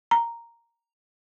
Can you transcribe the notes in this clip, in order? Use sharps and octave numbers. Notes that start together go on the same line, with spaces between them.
A#5